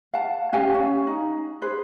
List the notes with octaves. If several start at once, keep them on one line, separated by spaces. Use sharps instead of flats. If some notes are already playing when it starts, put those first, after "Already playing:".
F5 F#5 A5
C#4 G4 F5 G#5
C#4
D#4
G#4 B4 C5